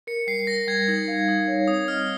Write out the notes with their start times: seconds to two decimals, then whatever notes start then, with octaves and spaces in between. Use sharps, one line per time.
0.07 A#4 C#7
0.27 G3 C7
0.39 C7
0.47 A#4 A#6
0.68 G3 G#6
0.88 D#4
1.08 F5
1.28 D#4
1.47 C#5
1.68 C4 D#6
1.88 D#5 F6